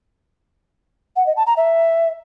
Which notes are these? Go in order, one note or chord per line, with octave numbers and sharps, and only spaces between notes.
F#5
D#5
A5
A#5
E5